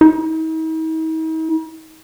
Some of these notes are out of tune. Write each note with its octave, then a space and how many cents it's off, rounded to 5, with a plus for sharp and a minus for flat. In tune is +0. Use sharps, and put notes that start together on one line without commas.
D#4 +45